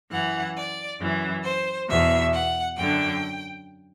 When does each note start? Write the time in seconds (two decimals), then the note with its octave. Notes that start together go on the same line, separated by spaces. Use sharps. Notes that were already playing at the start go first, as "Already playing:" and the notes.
0.10 F#2 E3 F#5
0.56 D5
1.00 F#2 E3
1.44 C5
1.89 E2 B2 E5
2.33 F#5
2.77 F#2 D3 G5